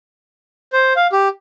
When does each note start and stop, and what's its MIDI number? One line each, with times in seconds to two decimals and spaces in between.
0.73 0.93 72
0.96 1.07 77
1.12 1.28 67